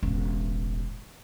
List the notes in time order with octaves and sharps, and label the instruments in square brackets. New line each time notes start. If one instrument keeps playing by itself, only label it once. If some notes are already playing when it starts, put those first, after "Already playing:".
[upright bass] E1 A1